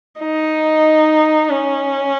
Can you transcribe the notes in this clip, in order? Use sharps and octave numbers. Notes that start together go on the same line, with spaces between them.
D#4
C#4